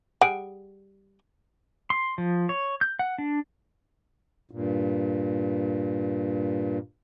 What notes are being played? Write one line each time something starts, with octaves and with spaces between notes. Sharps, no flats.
G3 G#4 F#5 D7
C6
F3
C#5
G6
F#5
D4
G2 A#2